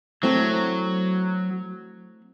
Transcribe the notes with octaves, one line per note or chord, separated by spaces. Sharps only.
F#3 A3 C4 E4